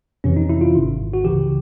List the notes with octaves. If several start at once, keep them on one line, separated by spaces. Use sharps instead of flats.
F2 C3 E3 C#4
D#4
E4
F4
G#1 G#2 D#3
F#4
C#2 C#3 E3 G4